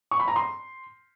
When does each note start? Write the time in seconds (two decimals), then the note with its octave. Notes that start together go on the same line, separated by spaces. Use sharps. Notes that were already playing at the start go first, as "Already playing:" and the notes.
0.11 C#6
0.20 B5
0.28 A#5
0.36 C6